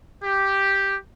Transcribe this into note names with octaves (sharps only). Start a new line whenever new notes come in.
G4